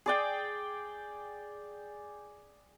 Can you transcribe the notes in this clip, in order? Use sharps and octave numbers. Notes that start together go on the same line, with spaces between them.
G#4 D5 G5